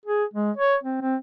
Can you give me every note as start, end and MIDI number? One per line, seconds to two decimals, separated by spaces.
0.06 0.24 68
0.34 0.51 56
0.57 0.76 73
0.84 1.02 60
1.02 1.16 60